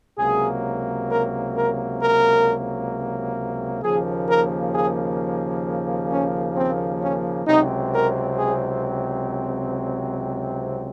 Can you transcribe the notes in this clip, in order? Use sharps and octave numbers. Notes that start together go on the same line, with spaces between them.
C#2 C3 F#3 A#3 G#4
A#4
A#4
A#4
D#2 C#3 F3 A#3 G#4
A#4
G#4
C#4
C4
C#4
C#2 C3 F#3 C4 D#4
A#4
G#4